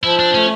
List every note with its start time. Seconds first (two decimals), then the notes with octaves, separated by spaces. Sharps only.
0.04 F3 E4
0.19 D4
0.34 A3 C#4